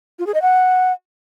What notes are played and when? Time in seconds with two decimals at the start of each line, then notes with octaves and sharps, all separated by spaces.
0.19 F4
0.27 G#4
0.34 D#5
0.42 F#5